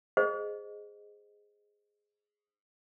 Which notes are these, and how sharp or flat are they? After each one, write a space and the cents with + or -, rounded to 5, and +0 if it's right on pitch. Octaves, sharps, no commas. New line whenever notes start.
G#4 +0 C5 -10 D#5 -15